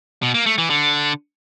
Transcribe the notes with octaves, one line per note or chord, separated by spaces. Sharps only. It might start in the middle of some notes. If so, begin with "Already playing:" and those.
B2
A#3
A3
E3
D3